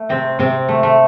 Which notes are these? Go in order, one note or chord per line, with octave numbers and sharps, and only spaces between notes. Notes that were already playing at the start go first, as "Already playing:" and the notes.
Already playing: A3
C3 C4
C3 C4
A3
A3